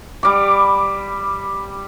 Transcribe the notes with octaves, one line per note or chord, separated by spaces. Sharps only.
G3 D6